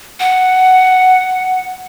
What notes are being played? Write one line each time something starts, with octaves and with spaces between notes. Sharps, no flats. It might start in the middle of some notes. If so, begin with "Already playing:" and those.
F#5